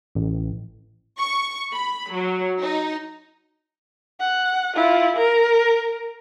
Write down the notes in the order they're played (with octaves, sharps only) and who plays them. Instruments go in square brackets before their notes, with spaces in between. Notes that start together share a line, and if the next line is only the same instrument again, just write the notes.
[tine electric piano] A1
[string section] C#6
B5
F#3
D#4
[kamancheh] F#5
E4 F4
A#4